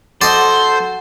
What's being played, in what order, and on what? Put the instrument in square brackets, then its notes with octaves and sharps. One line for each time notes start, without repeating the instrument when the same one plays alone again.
[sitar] F#4 [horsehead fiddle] A4 [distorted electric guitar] C5 [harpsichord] D5 D#5